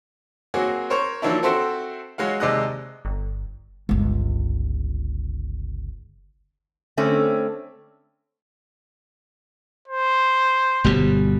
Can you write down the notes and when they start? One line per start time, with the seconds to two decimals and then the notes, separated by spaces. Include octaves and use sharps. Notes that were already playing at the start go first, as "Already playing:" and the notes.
0.54 F#3 A#3 C4 F#4 G#4
0.90 A#4 C5 C#5 C#6
1.22 D#3 F3 F#3 A#3 D4 E4
1.42 C4 F#4 A4 C5 E5 G5
2.18 F#3 G#3 F#4 F5
2.40 D#2 C3 G#3 D5 D#5 F#6
3.05 G1
3.89 G1 C#2
6.97 D3 A3 C4 C#4
9.88 C5
10.84 G1 B2 G3